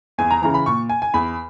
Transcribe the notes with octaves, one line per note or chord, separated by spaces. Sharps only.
E2 G#5
A#5
C#3 E3 A#5
B5
A#2 C#6
G#5
G#5
E2 B5